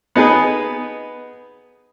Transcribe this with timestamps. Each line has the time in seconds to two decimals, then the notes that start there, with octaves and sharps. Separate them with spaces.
0.16 B3 D#4 G#4 B4